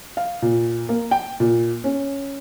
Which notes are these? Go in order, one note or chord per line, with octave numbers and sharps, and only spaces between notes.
F5
A#2
A#3
G5
A#2
C#4